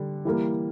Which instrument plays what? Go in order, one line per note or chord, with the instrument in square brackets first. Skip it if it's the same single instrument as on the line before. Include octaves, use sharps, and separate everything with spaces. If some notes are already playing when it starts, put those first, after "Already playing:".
Already playing: [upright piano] D3 G3 D4
E3 G3 A#3